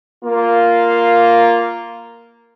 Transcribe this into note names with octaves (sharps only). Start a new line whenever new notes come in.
A#3 F4